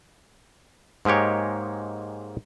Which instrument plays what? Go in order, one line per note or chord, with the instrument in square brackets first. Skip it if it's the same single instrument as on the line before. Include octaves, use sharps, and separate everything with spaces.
[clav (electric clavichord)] G#2 G#3 A#3 G4 C#5